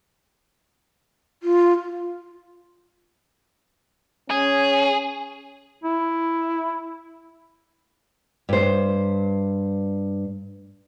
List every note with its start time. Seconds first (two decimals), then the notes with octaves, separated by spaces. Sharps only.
1.43 F4
4.30 C#4 G#4
5.84 E4
8.49 G2 C5